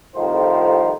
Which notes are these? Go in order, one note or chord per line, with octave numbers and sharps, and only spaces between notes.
C2 F2 A2 D#3 F3 C5